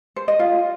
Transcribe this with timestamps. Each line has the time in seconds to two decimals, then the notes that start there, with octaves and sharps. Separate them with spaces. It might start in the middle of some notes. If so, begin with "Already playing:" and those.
0.16 C5
0.28 D#5
0.39 F4